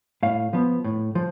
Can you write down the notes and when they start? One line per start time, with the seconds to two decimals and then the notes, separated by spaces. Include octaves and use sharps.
0.23 A2 F5
0.53 F3 B3
0.84 A2
1.15 F3